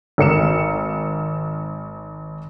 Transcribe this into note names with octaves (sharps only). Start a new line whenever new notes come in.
G#1 A#4 C#7 E7